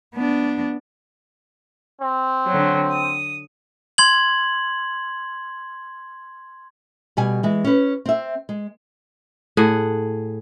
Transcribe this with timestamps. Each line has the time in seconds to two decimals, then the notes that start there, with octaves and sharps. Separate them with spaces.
0.15 B3 D4
2.01 C4
2.47 D3 F#3
2.92 D#6
3.98 C6 G#6 F#7
7.17 B2 G3 G#5
7.43 E3 G#3
7.64 C#4 B4
8.06 C4 E5
8.49 G#3
9.57 A2 G#4 F#5